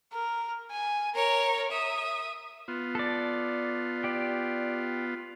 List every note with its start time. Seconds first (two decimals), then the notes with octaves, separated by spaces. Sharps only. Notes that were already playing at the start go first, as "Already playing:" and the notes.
0.13 A#4
0.71 G#5
1.15 A#4 C#5 A#5
1.72 E5 D#6
2.68 B3 F4
2.95 A4 D5
4.04 G4 D5